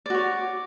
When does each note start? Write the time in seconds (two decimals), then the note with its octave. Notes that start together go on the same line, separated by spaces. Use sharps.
0.06 D5
0.10 F#4
0.14 C#5